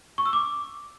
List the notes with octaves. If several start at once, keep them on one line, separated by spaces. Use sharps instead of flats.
C#6
E6
D6